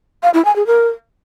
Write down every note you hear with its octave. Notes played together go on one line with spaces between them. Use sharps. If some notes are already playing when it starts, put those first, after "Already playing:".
F5
E4
G#5
G#4
A#4